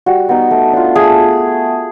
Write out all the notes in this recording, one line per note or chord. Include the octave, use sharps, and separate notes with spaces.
G3 F#4
B3 D#4
A3
D4 F4
A3 G#4